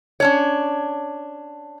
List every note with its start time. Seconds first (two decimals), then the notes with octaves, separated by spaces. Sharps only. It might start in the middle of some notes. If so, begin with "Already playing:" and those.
0.20 C#4 D4 C#5